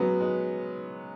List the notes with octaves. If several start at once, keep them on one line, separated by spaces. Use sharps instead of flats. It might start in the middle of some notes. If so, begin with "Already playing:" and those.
Already playing: F#3 G#3 B3 C#4
G#3